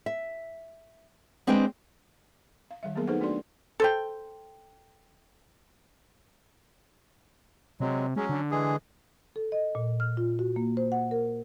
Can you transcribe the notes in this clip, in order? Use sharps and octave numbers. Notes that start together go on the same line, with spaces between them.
E5
G#3 C4 D4 B4 G5
F5
D#3 G3 E5
F#3 A#3 B3 G#4 A#4
D#4 G#4 A4 B4 C5 F#5
A3 D4 F#4 A4 D5 C6
A4 C5 G5
C3 F#3 G#3
F#3 G#3 C#4
D3
E3 G#3 G#4
A4
D#5
A#2
F6
F4
F#4
A#3
C5
F#5
A#4